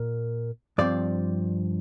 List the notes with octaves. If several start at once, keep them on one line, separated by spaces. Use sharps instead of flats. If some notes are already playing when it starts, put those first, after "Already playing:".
Already playing: A#2 A#3
G2 F3 C4 D5